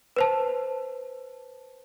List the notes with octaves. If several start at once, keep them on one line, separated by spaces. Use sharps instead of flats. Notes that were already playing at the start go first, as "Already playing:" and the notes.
B4 C5 A5